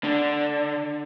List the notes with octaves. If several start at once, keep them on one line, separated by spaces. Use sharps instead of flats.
D3